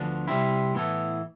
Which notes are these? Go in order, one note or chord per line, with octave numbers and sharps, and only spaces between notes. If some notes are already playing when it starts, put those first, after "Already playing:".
Already playing: D2 D3 F3 B3 D4
C2 C3 G3 C4 E4
A2 E3 B3 E4 A4